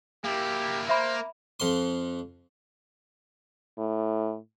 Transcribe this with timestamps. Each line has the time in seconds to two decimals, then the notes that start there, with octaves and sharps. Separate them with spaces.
0.24 A#3 E4 G4
0.89 A#3 C5 E5 B5
1.60 F2 C6
3.78 A2